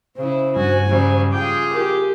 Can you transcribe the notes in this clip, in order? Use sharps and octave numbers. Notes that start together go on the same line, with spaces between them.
C#3 E4 C5
G2 F#4 G#5
C#3 F#3 G3
F4 G#4 G5 D6
G4 A#4